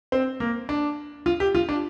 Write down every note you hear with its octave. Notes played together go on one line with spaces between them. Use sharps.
C4
A#3
D4
F4
G4
F4
D4